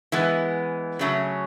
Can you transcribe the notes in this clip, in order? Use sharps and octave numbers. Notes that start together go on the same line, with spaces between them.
E3 G#3 B3
C#3 F#3 A3 C#4